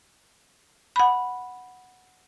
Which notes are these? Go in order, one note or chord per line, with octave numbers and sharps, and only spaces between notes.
F#5 B5